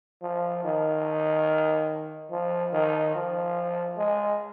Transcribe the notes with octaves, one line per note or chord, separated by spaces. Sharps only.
F3
D#3
F3
D#3
F3
G#3